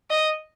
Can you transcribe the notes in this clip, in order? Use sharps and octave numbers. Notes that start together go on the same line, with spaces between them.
D#5